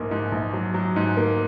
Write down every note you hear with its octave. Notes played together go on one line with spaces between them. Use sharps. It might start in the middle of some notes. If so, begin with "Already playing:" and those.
Already playing: A#1 G#2 A#3
G#2
A#1
F#3
F#3
G#2
A#3